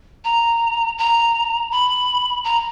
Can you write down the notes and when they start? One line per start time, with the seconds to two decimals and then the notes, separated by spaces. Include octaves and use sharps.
0.25 A#5
0.98 A#5
1.71 B5
2.44 A#5